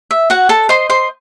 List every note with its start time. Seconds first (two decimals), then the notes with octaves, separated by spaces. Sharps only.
0.11 E5
0.30 F#4 C#5 F#5
0.49 A4 A5
0.69 C5 D#5 C6
0.90 C5 C6